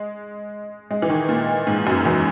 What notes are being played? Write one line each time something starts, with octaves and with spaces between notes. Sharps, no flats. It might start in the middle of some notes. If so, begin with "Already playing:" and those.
Already playing: G#3
G#3
E3
D#3
A#2
G#2
F#2
E2